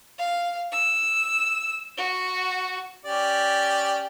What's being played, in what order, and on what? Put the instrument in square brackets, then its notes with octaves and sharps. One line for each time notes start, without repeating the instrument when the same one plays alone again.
[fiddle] F5
E6
F#4
[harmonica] C#4 G4 D5